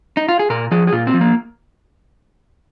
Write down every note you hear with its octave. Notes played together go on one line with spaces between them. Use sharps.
D#4
F4
G#4
A#2 A#4
F3 G#4
G#4
A#2 F4
C4
F3
A#3